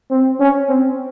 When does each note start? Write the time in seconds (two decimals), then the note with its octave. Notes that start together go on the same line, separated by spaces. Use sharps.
0.11 C4
0.40 C#4
0.69 C4